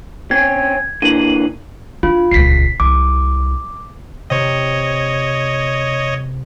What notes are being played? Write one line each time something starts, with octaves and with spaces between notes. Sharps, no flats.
C4 C#4 G#6
D3 E3 A#3 D#7 F#7
D4 F4
D#1 C#2 B6 C7
C2 D6
C3 C#5 D#5